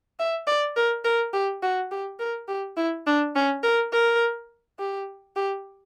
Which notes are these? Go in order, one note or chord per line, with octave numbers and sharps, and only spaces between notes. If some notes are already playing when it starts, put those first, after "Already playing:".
E5
D5
A#4
A#4
G4
F#4
G4
A#4
G4
E4
D4
C#4
A#4
A#4
G4
G4